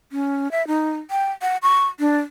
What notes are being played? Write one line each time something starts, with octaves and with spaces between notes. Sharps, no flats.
C#4
E5
D#4
G5
F#5
C#6
D4